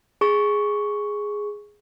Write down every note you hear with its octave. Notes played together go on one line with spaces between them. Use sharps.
G#4 C#6